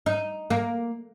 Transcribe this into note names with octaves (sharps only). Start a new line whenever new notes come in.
D#4
A#3